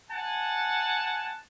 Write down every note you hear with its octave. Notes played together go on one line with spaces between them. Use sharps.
F#5 G#5 A5